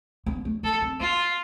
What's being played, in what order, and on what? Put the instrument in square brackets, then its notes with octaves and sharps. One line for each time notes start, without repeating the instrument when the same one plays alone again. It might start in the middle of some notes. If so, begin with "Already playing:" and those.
[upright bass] B3
A3
[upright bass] B3 [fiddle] A4
[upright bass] C4
[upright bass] B3 [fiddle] F4